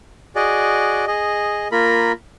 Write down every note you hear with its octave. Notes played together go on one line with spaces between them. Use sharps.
F#4 G#4 D5 D#5
G#4 D#5
A#3 F4 A#4 B5